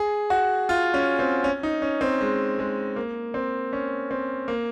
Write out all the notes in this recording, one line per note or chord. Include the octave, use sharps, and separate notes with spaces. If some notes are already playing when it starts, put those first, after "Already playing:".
Already playing: G#4
F#4
F4
C#4
C4
C#4
D#4
C#4
C4
G#3
G#3
A#3
C4
C#4
C4
A#3